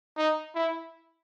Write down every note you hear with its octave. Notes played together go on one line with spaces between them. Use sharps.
D#4
E4